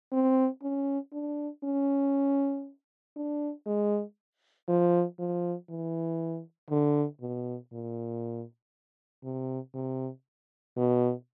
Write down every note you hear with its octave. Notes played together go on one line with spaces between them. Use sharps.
C4
C#4
D4
C#4
D4
G#3
F3
F3
E3
D3
B2
A#2
C3
C3
B2